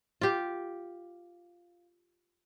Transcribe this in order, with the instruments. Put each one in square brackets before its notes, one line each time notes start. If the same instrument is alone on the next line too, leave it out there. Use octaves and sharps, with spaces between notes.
[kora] F4 G4